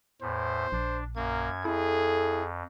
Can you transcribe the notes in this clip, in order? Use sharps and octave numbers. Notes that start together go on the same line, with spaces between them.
E2 A2 C5
A#1 D4
F#2 A#3 G#6
F2 E4 G#4 A4